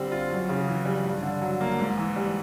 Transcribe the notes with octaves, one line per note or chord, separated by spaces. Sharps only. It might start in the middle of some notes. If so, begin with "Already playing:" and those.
Already playing: D3 G3 C4
F4
F#2
C#3
E3
G3
G2
D3
F#3
A#3
G#2
E3
G3